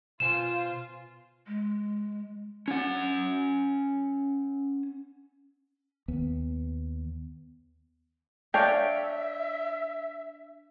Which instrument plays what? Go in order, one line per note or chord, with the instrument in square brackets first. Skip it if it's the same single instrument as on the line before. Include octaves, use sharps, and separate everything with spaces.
[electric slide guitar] B2 C5 G#5 [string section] F4 [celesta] E7
[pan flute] G#3
[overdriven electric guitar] C#4 F#5
[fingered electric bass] D#2 B3
[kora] D4 C#5 F5 [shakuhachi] E5 [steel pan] G5